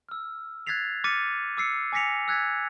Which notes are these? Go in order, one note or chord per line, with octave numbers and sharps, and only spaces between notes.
E6 F6
F#6 G#6 A6 B6 C7 F7
D6 F6 A6 B6 C#7 D#7
D6 E6 C7 C#7
G#5 D6 A#6 B6 C#7 F7
E6 F#6 G#6 A6 B6